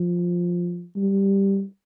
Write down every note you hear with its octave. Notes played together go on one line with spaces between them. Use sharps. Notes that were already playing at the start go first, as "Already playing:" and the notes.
Already playing: F3
G3